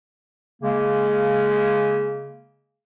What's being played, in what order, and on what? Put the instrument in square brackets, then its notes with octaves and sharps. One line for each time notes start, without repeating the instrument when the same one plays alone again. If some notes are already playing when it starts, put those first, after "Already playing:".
[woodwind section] C#3 G#3 A#3